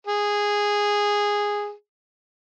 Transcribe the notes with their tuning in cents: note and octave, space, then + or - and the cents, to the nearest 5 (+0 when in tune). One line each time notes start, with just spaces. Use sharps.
G#4 -10